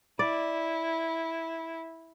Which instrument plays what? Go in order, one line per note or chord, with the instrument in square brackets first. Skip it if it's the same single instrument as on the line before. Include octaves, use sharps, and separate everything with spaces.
[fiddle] E4 [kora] D5